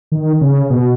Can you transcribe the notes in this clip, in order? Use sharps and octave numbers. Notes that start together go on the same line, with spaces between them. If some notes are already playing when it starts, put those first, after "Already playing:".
D#3
C#3
B2